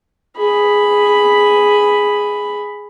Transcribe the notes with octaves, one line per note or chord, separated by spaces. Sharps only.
G#4 B5